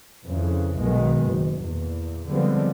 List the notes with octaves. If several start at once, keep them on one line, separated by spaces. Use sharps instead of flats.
F2 C#3 E3
B1 B2 D#3 G#3 B3
F#1
E2 A#2
D3 F3 G3 G#3 B3 C4